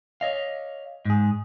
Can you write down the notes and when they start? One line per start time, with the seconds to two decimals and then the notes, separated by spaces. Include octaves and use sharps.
0.21 C#5 D#5 F5
1.05 G#2 G#4